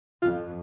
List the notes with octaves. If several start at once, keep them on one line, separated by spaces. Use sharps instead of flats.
F2 F4